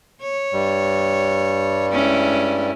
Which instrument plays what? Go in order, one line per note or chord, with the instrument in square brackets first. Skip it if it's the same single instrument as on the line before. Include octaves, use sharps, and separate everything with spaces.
[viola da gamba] C#5
[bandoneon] G2 G3
[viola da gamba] G#3 C#4 E4